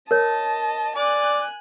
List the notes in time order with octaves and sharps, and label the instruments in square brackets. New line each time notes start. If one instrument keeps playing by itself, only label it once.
[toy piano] A#4 C#5 [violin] D#5 A5
[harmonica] D5 [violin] G#5 F#6